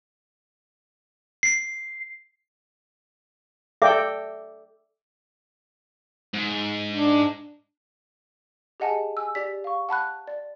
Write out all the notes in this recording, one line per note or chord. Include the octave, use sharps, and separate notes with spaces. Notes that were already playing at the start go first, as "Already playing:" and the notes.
C7
A4 D5 E5 G5 D6
G#2
D4
G4 G#4 D#5 F#5 G#5 A5
G#5 E6
G4 D5 B6
F5 C#6
F#5 A5 B5 F#6
D5